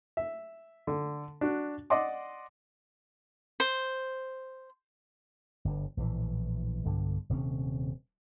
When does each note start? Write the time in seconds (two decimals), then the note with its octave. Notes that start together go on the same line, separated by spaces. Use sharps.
0.17 E5
0.87 D3
1.41 D4 F#4
1.90 D5 D#5 F#5 C6 D6
3.60 C5
5.65 G1 G2
5.97 A#1 A2 E3
6.84 B1 G2 D3
7.29 D#1 C3 A#3 C#4